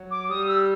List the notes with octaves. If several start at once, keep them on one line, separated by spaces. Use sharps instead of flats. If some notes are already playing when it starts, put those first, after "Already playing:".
Already playing: F#3
D6
G3 D#6
E6